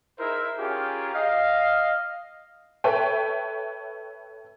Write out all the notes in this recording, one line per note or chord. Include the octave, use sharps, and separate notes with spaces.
D#4 E4 G#4 A#4 C5 E5
C#4 F4 G4 G#4 A#4
D#5 F5
A4 B4 C#5 E5 G5